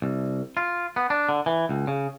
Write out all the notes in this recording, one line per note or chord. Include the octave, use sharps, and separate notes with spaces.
C2
F4
B3
D4
D3
E3
C#2
C#3